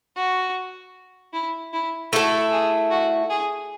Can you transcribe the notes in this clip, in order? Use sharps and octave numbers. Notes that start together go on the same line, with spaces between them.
F#4
E4
E4
A3 E4 F#4 A4
G#4
F#4
G#4